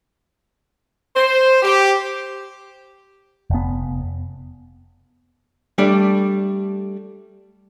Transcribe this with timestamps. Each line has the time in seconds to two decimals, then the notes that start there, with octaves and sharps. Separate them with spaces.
1.15 C5
1.63 G4
3.50 F1 B3
5.78 G3 A3 D4